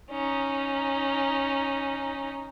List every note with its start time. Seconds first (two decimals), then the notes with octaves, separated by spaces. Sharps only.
0.11 C#4 D#4